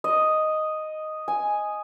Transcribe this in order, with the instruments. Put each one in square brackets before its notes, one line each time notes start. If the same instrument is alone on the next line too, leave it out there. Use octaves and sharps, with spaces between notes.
[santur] D#5
G#5